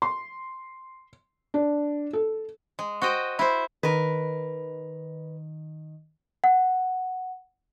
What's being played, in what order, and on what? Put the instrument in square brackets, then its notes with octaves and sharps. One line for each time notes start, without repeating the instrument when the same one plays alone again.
[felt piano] C6
D4
A4
[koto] G#3
F#4 C5 D#5 G5
E4 C5
[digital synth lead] D#3 [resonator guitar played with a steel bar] A#4 B4
[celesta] F#5